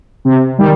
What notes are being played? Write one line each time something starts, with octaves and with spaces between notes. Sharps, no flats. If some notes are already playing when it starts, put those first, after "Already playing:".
C3
D#3 G3